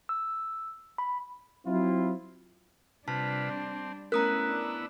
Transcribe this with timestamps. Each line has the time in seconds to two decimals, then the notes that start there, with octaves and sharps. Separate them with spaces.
0.09 E6
0.98 B5
1.66 F#3 C4 E4 F4
3.08 C3 G3 D4 F4 B4 A5
3.50 C4
4.12 A3 B3 C#4 E4 A#4 A#5 D#6 F#6
4.47 D4